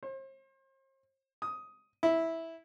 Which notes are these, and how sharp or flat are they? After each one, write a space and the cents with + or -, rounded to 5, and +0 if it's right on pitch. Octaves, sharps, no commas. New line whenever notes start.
C5 +40
D#6 +10
E4 -10